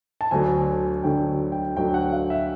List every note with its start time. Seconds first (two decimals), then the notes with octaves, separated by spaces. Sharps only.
0.21 A5
0.31 D2 D3 F#3 G#5
1.03 D2 D3 F#3 G5
1.52 G5
1.77 D2 D3 F#3 G5
1.94 F#5
2.12 F5
2.30 E5